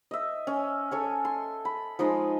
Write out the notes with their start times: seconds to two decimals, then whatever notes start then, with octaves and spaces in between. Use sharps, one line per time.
0.11 D#5 E5
0.47 C#4
0.91 A4 C#5 G#5
1.25 C6
1.65 B5
1.99 F3 G#3 D#4 D#5